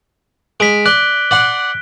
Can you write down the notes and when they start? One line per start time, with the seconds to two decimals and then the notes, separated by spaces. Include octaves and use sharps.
0.60 G#3 B6 D7
0.86 D5 F#6 G7
1.31 D5 F#5 C6